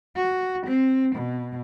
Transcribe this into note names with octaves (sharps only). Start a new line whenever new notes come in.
F#4
C4
B2